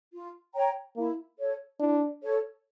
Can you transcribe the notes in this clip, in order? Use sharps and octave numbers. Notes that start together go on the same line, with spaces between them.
F4
C#5 G5 A#5
A#3 E4
A4 C#5
D4 E4
A4 C#5